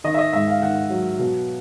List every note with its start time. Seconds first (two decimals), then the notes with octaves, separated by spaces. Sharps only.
0.04 D#3 D#5
0.14 E5
0.18 D#5
0.33 G#2 E5
0.47 F5
0.62 D#3 F#5
0.90 F#3
1.19 B2